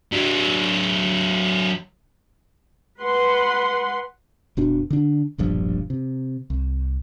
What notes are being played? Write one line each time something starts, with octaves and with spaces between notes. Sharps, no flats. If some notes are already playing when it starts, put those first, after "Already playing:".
F#3 D4
B4 F#5 C6
F1 B2 D4
D3 D4
E1 A#1 G2 F3
C3
C2